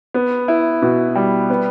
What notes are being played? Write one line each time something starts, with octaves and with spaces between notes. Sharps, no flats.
B3
E4
B2
G3
B3